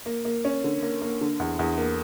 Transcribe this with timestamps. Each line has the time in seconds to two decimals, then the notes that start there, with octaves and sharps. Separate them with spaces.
0.06 A#3
0.25 A#3
0.45 C#4
0.64 D3
0.83 A#3
1.02 A#3
1.21 D3
1.40 E2
1.59 E2
1.78 A#3